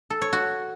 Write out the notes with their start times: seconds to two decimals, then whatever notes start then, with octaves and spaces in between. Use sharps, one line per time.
0.10 A4
0.22 C#5
0.33 F#4